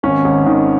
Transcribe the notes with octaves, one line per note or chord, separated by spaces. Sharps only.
G#1 C#4
G#1
D#3